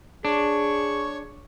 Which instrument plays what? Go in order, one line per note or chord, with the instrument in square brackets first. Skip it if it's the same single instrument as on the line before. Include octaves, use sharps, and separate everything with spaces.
[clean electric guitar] D4 [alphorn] G#4 [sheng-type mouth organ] C#5 C#6